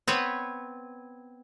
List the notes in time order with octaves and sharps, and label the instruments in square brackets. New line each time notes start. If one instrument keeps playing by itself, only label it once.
[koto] B3 C4 B4 C#5